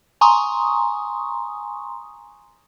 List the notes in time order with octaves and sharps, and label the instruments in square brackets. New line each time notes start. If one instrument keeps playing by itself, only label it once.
[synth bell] G#5 A#5 C6 C#6 D#6